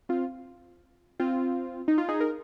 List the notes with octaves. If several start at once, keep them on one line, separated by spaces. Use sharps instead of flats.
C4 F4
C4 F4
D#4
F4
D#4 G#4
A#4